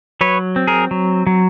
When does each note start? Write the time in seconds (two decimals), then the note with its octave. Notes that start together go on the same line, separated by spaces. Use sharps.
0.21 F#3 B4 C#5
0.56 C4
0.67 G#4 A#4
0.91 F#3
1.27 F#3